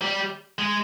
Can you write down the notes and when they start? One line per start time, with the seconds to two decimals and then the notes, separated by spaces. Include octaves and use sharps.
0.02 G3
0.59 G#3